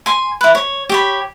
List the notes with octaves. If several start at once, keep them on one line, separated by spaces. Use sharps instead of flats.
G#5 C6
E4 B4
C#5
G4 C#5 B5